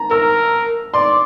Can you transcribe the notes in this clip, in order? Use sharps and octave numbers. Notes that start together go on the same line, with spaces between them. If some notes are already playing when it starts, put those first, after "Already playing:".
Already playing: A5 A#5
A#4 E6
D5 C6